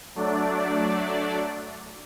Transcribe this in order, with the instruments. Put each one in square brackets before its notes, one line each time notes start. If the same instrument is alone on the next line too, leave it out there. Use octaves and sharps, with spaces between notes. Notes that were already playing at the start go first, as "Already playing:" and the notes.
[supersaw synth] F#3 A3 D4 D5